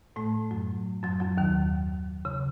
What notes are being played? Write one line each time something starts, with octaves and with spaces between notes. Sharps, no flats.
A2 A3
F#2 F#3
F#2 F#3
F#2 F#3
D#2 D#3
C#3